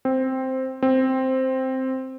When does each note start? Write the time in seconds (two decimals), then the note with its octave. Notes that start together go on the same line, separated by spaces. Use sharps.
0.05 C4
0.82 C4